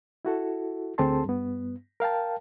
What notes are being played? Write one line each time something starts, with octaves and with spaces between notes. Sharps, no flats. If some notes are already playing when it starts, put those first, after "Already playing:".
E4 F#4 A4
D2 C4 G#4 A4 A5 C6
G2 B3
A#4 F5 G5 A5